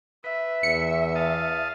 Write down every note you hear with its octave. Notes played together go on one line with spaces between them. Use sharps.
B4 E5
E2 C#7
F5 A5 D#6